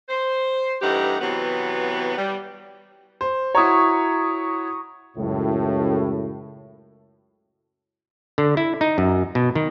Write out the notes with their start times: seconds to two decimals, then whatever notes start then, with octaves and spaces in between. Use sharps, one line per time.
0.09 C5
0.82 G2 E3 A3 D#4 G4 F#5
1.20 C3 E3 F#3 B3
2.17 G3
3.21 C5
3.55 E4 F#4 C#5 A#5 C#6 D#6
5.17 C#2 F#2 A2
8.38 D3
8.57 E4
8.81 D#4
8.98 F#2
9.35 B2
9.55 D#3